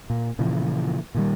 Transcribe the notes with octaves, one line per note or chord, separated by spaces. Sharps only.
A#2
A#2 C#3 E3 F3
A#2 D#3 G3